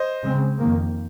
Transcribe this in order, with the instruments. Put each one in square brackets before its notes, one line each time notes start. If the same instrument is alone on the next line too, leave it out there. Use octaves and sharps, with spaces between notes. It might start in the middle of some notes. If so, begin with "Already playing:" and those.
Already playing: [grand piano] C5 D#5
[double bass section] C#3 G#3 C4
F2 D#3 A#3